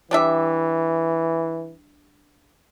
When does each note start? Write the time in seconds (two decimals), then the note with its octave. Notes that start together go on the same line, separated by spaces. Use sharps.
0.11 E3 G3 D4 E5